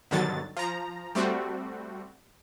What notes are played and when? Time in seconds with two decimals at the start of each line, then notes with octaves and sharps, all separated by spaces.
0.11 G2 B2 D3 D#3 F#3 A6
0.57 F3 A#5
1.15 G3 A3 C4 F#4